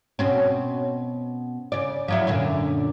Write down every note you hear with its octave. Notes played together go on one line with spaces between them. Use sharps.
B2 C4 C#4
C#3 D5
F3 F#3 E4
F#2 A#2 D3